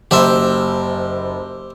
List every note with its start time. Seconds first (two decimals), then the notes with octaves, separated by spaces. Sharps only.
0.11 F#1 F#2 G4 C5 E5